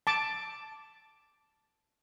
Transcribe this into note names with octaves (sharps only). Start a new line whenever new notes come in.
A5 D6